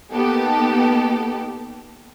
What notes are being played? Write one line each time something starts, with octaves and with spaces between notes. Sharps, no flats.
A#3 B3 D#4 G4 A4